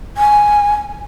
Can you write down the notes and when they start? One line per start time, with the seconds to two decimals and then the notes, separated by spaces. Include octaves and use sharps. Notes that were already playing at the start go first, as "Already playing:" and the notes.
0.17 G#5